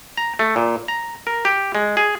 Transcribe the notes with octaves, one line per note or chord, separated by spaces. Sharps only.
A#5
A3
A#2
A#5
A#4
G4
G#3
G#4